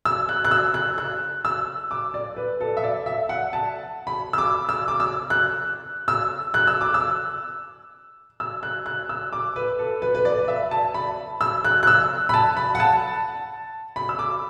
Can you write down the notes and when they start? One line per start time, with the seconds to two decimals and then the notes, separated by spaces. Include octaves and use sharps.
0.05 E6
0.29 F#6
0.45 F#6
0.51 E6
0.74 F#6
0.98 F#6
1.45 E6
1.91 D6
2.14 D5
2.37 B4
2.61 A4
2.77 E5
2.83 D5
3.06 E5
3.29 F#5
3.53 A5
4.07 B5
4.33 E6
4.38 D6
4.69 E6
4.88 D6
5.00 E6
5.30 F#6
6.08 E6
6.54 F#6
6.67 E6
6.81 D6
6.94 E6
8.40 E6
8.63 F#6
8.86 F#6
9.09 E6
9.33 D6
9.56 B4
9.79 A4
10.02 B4
10.15 B4
10.25 D5
10.48 E5
10.71 A5
10.94 B5
11.41 E6
11.64 F#6
11.83 F#6
11.87 E6
12.29 B5
12.34 A5
12.57 B5
12.75 F#5
12.80 A5
13.96 B5
14.09 E6
14.19 D6